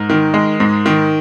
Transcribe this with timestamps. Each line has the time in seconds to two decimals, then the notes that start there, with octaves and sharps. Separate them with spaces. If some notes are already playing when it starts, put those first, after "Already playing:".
Already playing: G#2 A#4
0.10 D#3
0.34 G#3
0.60 G#2
0.86 D#3